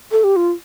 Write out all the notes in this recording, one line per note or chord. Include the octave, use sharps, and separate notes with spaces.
A4
G4
F4